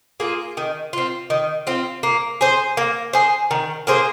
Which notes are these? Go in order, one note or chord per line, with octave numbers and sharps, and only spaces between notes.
A#3 F4 G#4
D#3
C4 F4
D#3
C4 F4
A#3
G#4 C5
A#3
G#4 C5
D#3
A#3 G#4 C5